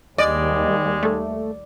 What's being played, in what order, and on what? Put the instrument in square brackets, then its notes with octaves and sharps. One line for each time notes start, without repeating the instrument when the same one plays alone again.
[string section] D#2 G3 [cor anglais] G#3 [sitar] D5 [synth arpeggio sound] D#5
[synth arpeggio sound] A3 A4